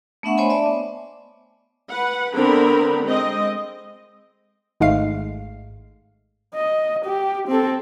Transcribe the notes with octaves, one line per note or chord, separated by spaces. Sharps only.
A3 B3 D4 E5 F#5 C#6
C5 C#5 D#5 G#5 B5 C6
D5 E5 A5
B3 D6
B4 F#5
D3 B3 C4 A#4 B5
G#3 C4 D#5
G#1 G#2 G#3 A3 F5 C7
D#5
G4
C4 A4